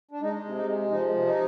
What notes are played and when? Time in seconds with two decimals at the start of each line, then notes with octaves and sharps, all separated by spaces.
0.11 D4
0.21 G#3 D#4
0.45 C3
0.56 D#4
0.67 G#3
0.91 F3 D#4
1.14 C3
1.25 D#4